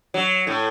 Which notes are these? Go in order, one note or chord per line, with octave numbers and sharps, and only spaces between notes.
F#3
A2